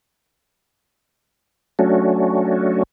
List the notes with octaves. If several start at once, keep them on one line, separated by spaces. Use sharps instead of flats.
F#3 A3 C#4 D4 F#4